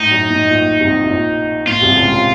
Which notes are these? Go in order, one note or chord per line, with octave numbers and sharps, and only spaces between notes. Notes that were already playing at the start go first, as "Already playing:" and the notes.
Already playing: A2 D#4
F#2
A2
A#1 A#2
C2 C3
C3
A#1 A#2
A2 F4
C2 C3
C#2 C#3
C3